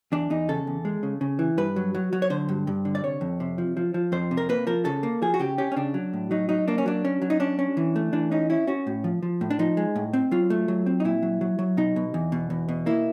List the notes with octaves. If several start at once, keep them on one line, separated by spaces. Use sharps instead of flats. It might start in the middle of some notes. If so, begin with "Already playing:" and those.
E2 D4
E2 D#4
C#3 A4
E2
G#3
C#3
C#3
E3
G2 B4
F#3
F#3
F#3
C#5
D3 C5
G2
G2
D3
D5
C3 C#5
F2
C3
F3
F3
F3
F2 C5
C3
A#4
A#3 B4
F3 A#4
C#3 A4
A#3
F3 G#4
F#4
C#3 G4
C#4 G4
C#4
C#3 D4
F#3
A2
F#3 D#4
F#3 D#4
A#3 D4
C#4
F#3 D4
C#4
F#3
D#4
C#4 D4
C#4
E3
A3
E3 D4
C#4 D#4
C#4 E4
C#4 F#4
A2
F3
F3
A2
D4
F3 D#4
G#3
A2
C4
F#3 F4
A3
F#3
C4
D#4
A#2 E4
F#3
F#3
F#3
B2 D#4
B2
E2
B2
E2
B2
A#3 E4